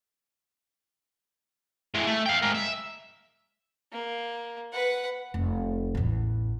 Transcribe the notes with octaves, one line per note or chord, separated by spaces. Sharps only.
E3 G#3
A3
F5 G5
G#3 A#4
E5
A#3
B4 F#5
F1
A1 E2